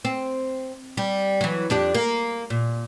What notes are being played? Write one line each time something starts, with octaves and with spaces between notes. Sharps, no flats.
C4
G3
E3 F#3
F2 D4 G4
A#3
A#2